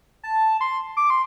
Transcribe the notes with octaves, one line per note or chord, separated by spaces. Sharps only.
A5
C6
D6
C6